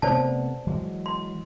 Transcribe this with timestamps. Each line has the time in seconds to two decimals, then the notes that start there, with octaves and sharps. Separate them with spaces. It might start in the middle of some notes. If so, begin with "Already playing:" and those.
0.02 C3 A3 B3 C5 D5 A5
0.67 E3 F#3 G#3
1.06 C6